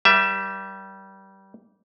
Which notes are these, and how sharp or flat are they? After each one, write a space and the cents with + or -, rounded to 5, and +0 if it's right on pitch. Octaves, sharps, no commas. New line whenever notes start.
G3 -20 A#4 +40 E5 +10